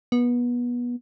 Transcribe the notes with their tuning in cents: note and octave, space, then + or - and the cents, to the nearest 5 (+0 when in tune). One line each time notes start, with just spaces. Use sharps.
B3 -25